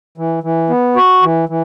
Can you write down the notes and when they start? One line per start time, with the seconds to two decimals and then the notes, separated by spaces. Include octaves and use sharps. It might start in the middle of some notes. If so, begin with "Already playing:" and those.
0.18 E3
0.43 E3
0.70 B3
0.96 F#4
1.22 E3
1.49 E3